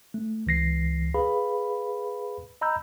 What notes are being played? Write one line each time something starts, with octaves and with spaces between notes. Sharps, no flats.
A3
C#2 E3 A#6 C7
G#4 B4 F5 B5
D#5 A#5 B5 E6 G6